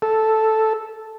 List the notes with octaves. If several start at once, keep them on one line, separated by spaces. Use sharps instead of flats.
A4